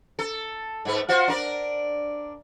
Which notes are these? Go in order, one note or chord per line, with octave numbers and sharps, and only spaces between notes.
A4
G#2 A3 B4
F4 F#4 C5
D4 A#4 D5